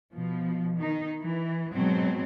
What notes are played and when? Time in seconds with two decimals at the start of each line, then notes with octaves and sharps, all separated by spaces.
0.13 B2 F3
0.77 D#3 D#4
1.22 E3
1.74 G#2 B2 F#3 C4